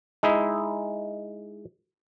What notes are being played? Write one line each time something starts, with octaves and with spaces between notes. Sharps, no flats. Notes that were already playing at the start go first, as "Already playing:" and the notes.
G#3 D#4 E4 E5